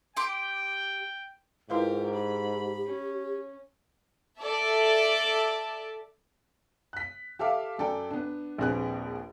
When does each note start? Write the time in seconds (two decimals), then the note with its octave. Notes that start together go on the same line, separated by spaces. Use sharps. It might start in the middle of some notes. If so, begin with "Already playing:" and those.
0.17 G4 G5 C6 D6
1.70 G#2 E4 F4 G4 A#4 B4 F5
2.13 G4 B5
2.86 C#4
4.41 A4 D5 E5 A5
6.93 F#6 B6
7.39 G4 A4 E5 F5 D6
7.79 F#2 A4 D5 G5
8.11 B3 D4
8.58 A#1 D#2 C4 G#4 B4 F#6